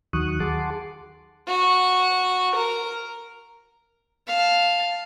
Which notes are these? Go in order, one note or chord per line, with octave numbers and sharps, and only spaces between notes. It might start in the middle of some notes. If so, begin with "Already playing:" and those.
D#2 D#3 F#3 C#6 D#6 F#6
G#4 F#5 A5 C6 D6
F#4
A#4
F5 A5